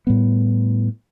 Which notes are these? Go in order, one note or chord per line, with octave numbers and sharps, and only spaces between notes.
A2 G3 B3